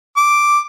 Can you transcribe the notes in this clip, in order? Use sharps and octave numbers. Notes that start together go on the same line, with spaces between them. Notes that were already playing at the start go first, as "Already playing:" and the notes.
D6